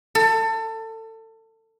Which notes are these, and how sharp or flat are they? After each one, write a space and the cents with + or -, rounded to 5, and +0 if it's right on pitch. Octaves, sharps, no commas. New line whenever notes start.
A4 +25